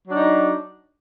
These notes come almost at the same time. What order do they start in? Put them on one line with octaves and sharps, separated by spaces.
F#3 D4 D#4